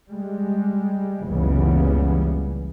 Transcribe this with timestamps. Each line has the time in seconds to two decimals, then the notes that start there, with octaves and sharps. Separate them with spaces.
0.11 G3 G#3
1.26 F#1 C#2 C#3 E3 G3 B3